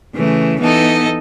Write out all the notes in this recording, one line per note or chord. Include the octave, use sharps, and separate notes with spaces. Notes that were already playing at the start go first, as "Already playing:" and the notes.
C#3 E3 A3
E3 B3 D#4 A4 D#5